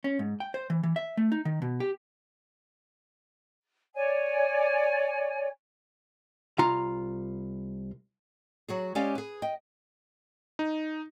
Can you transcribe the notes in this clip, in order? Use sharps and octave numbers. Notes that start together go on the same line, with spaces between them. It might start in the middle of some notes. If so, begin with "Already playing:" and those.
C#4
G#2
G5
C5
E3
E3
E5
A3
D#4
D#3
B2
G4
C#5 D5 G#5
C2 F4 A#5
F#3 F#4 G#4
G#3 C#4 G4 D5 F5 G#5
G#4 B4
D#5 G5
D#4